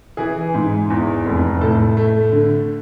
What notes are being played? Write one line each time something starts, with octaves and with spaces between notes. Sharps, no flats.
E3 G#4
G#2
E2
F1
A2 A4
A3
D3